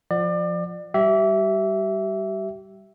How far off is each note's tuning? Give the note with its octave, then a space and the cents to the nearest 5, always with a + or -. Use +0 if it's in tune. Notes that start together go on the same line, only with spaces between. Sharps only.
F3 +0 D5 +30 F#5 +0
G3 +0 G4 -35 E5 +0